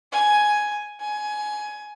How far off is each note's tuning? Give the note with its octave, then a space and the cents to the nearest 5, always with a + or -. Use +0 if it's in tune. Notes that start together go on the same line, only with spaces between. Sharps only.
G#5 +5
G#5 +20